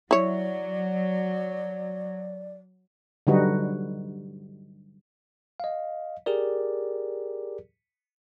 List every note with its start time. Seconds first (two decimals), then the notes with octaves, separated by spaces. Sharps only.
0.11 F#3 E4 C#5 D5
3.27 D3 F#3 G3 D#4 F#4 B4
5.60 D#5 F5
6.26 G4 G#4 A#4 D5